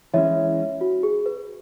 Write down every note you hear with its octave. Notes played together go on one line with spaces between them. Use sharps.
E3 G#3 C#4 C#5 E5
F#4
G#4
B4